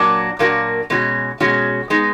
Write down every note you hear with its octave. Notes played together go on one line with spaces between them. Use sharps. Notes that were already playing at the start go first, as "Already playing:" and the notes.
Already playing: A#2 F#3 A#3 D4 F#4
A#2 F#3 A#3 D4 F#4
B2 G#3 C#4 F#4
B2 G#3 C#4 F#4
G#3 B3 D#4